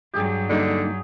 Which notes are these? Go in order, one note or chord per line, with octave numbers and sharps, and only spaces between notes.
G2 F#3 G4 G#4
D3 G3 A#3 D#4